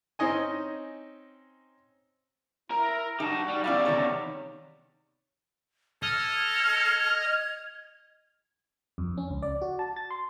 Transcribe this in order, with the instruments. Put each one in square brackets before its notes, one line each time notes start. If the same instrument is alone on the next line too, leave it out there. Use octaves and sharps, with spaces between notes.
[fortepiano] C4 C#4 D#4 D#5 G#5
[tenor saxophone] E4 [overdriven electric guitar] A#4
[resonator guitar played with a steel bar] D#4 [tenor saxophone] F#4 [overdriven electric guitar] G4 A5
[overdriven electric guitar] G3
[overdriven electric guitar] E2 G3 [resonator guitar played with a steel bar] C#4 E4 F5 [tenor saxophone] D5
[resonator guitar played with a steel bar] C3 D#3 C#5
[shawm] A4 [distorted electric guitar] D#5 [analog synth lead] F6 [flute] G#6
[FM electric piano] F2
C#4
C#2
D5
F#4
A5
A6
C6